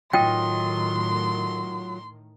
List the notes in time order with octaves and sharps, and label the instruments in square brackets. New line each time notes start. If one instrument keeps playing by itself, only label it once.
[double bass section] A2 D#3 [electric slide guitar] F#3 F4 D#5 [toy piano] G5 [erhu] C6